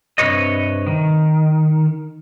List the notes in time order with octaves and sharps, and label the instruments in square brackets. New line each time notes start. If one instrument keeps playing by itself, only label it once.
[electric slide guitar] G2 C3 D#3 B4 C#5 D#5
D#3